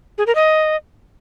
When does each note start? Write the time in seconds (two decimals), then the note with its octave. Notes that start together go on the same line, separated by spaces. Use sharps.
0.18 G#4
0.26 A#4
0.35 D#5